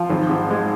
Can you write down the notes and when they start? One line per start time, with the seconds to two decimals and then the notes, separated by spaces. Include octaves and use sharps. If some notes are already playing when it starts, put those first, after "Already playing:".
Already playing: F3
0.09 G#1
0.29 G#2
0.50 G#3